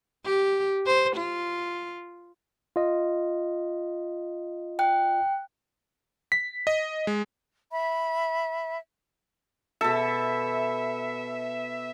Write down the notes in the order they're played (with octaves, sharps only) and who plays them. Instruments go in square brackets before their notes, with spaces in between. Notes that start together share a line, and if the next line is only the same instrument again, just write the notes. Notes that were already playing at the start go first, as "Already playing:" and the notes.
[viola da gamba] G4
C5
F4
[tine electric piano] F4 D#5
[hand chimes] G5 F#6
[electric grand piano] B6
D#5
G#3
[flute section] E5 B5
[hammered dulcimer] B2 A4 [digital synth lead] E5